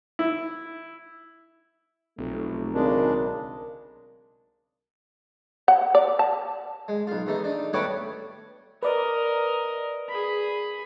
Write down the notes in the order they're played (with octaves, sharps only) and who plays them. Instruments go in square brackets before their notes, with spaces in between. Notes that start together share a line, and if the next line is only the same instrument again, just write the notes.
[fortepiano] E4
[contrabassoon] F1 [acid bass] B1 [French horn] A3
[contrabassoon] G#1 [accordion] C#3 G#3 D4 [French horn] A#4
[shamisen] F#5
D5
A5
[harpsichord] G#3
B1 F4
E2 A3 D#4
D4 D#4
G3 A3 B3 F#4 C#5 D6
[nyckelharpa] A#4 D#5 [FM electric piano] B4 D5
[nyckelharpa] G#4 B5